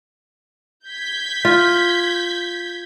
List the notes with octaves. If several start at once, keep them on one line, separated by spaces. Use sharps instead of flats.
G6 G#6 B6
F4